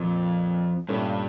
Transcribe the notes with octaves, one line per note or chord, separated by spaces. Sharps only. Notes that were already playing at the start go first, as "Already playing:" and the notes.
Already playing: F2 A#2
G2 A#2 A3 C#4